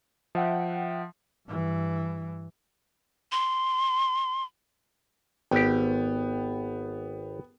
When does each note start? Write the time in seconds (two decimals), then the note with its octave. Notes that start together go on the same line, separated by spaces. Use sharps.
0.35 F3 E5 F#5 G5
1.48 G2 E3
3.32 C6
5.51 G#1 B3 G4 G5